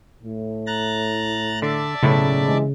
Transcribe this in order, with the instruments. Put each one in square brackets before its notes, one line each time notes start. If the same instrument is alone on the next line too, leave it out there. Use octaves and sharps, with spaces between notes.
[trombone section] A2
[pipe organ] A#5 F#6 A6
[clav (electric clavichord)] D3 [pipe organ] D5 E5 A5
[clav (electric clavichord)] B1 A2 E4 [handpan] C#3
[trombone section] C3 E3 G#3